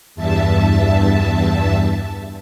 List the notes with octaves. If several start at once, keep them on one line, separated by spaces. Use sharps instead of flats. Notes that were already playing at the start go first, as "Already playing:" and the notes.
E2 G2 E5 A5